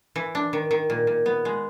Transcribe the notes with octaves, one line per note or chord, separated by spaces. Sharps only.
E3
D4
D#3
D#3
A#2
A#2
B3
G#3